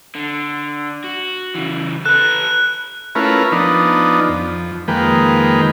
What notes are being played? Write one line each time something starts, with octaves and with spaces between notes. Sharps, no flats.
D3
F#4
C#3 E3
A4 B4 F#6
A3 C#4 E4 F4 A#4 B4
F3 B3 D4 D#4
F2
F2 D#3 G#3 A#3 B4 G5